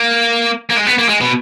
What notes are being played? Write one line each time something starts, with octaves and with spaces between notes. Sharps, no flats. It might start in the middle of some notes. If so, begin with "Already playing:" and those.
Already playing: A#3
A#3
G#3
B3
A#3
G#3
B2